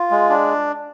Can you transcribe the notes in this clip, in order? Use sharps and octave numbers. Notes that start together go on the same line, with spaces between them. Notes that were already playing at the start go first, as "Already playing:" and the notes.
Already playing: F4
G#3
D4